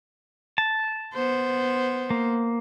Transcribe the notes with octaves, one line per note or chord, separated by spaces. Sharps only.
A5
B3 C5
A#3